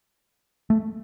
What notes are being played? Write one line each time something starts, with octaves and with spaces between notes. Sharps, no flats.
A3